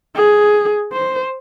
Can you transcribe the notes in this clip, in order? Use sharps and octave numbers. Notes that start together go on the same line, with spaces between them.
G#4
C5